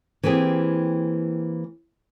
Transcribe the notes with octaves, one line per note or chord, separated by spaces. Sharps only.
E3 A#3 C4 G4 G#4